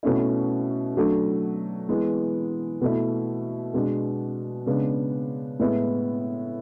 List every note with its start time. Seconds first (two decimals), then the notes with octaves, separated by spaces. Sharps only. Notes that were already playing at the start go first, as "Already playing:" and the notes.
0.03 B2 A3 C#4 E4
0.95 D3 F#3 A3 D4
1.89 E3 G#3 B3
2.81 B2 A3 E4
3.74 B2 G#3 D4
4.67 C#3 G#3 B3 D4
5.59 A2 G#3 B3 E4